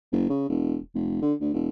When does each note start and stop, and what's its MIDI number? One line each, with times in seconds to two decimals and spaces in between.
0.12 0.26 30
0.30 0.45 49
0.49 0.77 28
0.95 1.20 29
1.22 1.33 50
1.41 1.50 38
1.54 1.69 28